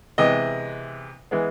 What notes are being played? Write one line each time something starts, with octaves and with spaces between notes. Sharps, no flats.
C3 E3 G#3 B3 D#5
E3 G#3 B3